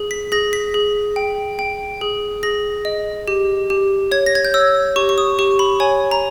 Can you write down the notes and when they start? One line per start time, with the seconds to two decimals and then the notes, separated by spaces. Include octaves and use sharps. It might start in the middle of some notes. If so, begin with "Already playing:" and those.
Already playing: G#4
0.11 B6
0.32 G#4 A#6
0.53 B6
0.74 G#4
1.16 G5
1.59 G5
2.01 G#4
2.43 G#4 A#6
2.85 D#5
3.28 G4
3.70 G4
4.11 C#5 G#6
4.26 A#6
4.35 G#6
4.45 G6
4.54 C#5 E6
4.96 G4 C#6
5.09 C#6
5.18 D#6
5.39 G4 C#6
5.59 B5
5.80 C#5 G#5
6.11 A#5